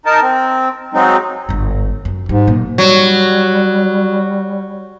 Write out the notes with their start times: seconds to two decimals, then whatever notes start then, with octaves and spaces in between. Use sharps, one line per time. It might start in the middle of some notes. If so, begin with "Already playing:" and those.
0.06 D#4 A#4 A5
0.23 C4
0.94 F#3 G#3 C4 D#4
1.49 G1 G#2
2.05 F#2
2.29 G#2 G3
2.48 B1 A#2
2.78 F#3 G3